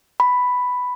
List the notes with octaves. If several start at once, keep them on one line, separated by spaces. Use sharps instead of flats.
B5